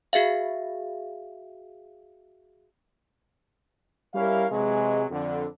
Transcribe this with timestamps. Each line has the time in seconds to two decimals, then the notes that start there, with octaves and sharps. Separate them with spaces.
0.13 F#4 G#4 E5 F5
4.14 G3 C#4 E4 A#4 E5 F5
4.51 C3 E3 F#3 G#3
5.10 F2 D3